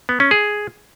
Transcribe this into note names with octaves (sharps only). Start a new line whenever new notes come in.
B3
C#4
G#4